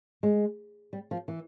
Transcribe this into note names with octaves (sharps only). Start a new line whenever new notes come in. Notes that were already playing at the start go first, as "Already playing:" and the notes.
G#3
G3
F3
E3